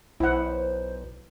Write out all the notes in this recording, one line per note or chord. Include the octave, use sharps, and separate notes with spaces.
B1 E4 C5 F#5